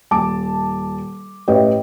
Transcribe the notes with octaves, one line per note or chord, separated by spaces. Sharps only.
D#1 A5 D6
A1 G4 B4 C#5 D#5 G5